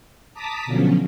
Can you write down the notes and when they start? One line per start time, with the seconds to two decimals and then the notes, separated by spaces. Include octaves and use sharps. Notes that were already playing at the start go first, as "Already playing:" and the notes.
0.33 A5 A#5 D6 D#6 B6
0.66 B2 D3 F3 F#3 C#4